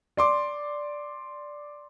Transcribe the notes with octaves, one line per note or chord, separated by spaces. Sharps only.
D5 C6 D6